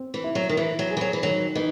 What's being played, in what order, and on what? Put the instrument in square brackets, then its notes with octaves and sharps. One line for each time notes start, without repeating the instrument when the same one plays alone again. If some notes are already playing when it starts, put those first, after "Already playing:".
Already playing: [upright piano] C4
[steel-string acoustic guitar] E3
[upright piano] E4
[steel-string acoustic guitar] F#3
D#3
[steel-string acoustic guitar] E3 [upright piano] E4
[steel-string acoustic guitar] F#3
[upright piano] G#4
[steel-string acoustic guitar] E3
F#3
E3
[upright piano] D#3 [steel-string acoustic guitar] F#3
[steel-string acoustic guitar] E3 [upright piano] D#4